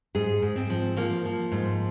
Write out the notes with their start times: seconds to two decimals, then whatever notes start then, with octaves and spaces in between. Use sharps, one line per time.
0.15 G#2 G#4
0.42 G#2
0.56 C4
0.70 F3
0.97 F3 A#3
1.25 F3
1.52 G#2